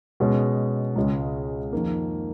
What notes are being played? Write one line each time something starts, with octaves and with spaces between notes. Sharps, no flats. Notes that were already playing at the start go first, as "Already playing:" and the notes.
B2 G#3 C#4
C#2 C#3 G#3
F2 D#3 A#3